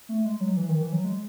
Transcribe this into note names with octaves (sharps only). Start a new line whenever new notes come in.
A3
G#3
F#3
E3
D#3
E3
F#3
G#3